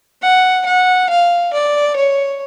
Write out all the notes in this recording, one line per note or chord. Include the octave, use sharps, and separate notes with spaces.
F#5
F#5
F5
D5
C#5